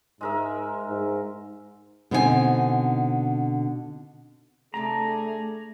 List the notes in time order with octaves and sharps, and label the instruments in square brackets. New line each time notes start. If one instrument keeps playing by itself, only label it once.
[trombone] G#2 [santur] G#3 A#4 E5
[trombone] G#2
[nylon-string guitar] B2 D3 C4 D#4 A4 G#5
[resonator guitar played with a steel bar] C3 D4 A4 [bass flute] A3 [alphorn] G#4 [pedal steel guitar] A#5